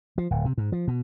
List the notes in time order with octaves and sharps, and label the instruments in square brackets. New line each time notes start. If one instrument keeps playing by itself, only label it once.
[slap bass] F3
D1
C3
G#2
F3
B2